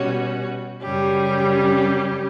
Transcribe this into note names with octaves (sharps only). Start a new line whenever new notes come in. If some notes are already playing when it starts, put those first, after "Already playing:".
Already playing: B2 G3 C#4 F#4
F#2 C#3 G3 C#4 G4